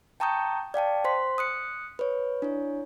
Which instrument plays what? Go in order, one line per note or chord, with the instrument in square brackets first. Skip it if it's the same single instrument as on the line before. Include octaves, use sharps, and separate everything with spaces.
[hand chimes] G5 A5 A#5 C#6 D#6 G6
D5 F5 G5 A5
C5 C6 B6
D#6 F#6 C#7
B4 C#5
D4 E4 C#5